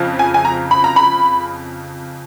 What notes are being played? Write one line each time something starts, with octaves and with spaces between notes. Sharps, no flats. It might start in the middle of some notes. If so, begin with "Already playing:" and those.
Already playing: F2 C#3
G#5
G#5
A#5
B5
A#5
B5